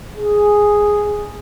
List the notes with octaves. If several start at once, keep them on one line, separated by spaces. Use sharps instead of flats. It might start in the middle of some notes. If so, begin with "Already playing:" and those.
G#4